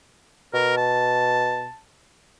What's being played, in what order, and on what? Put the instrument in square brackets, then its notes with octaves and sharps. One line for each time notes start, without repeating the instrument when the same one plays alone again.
[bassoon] B2 [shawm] A#4
[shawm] A5